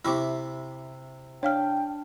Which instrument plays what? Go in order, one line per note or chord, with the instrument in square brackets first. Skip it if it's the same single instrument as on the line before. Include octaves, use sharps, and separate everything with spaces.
[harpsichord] C3 E4 [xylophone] E5 C#6 D6
[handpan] D4 [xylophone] C#5 F5 F6 [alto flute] G5